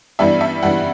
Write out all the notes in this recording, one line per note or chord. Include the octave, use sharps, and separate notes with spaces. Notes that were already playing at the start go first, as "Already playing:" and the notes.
G2 E3 G3 B3 D4 E5
E5
G2 E3 G3 B3 D4 F#5